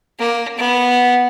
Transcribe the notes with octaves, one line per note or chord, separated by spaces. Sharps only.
A#3
B3